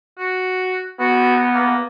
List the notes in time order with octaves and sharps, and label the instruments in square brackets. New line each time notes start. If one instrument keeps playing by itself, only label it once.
[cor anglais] F#4
[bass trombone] B3 [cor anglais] F#4
[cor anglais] A#3